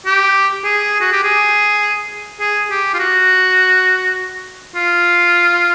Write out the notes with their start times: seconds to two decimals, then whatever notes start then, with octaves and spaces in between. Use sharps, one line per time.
0.06 G4
0.64 G#4
1.01 F#4
1.12 G4
1.24 G#4
2.40 G#4
2.70 G4
2.94 F4
2.99 F#4
4.75 F4